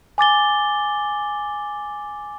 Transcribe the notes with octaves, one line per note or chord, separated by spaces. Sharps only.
G#5 D6 A6 G7